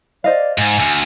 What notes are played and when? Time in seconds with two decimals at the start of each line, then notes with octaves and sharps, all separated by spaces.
0.24 C5 D5 D#5 F5
0.58 G#2 G#5
0.80 D2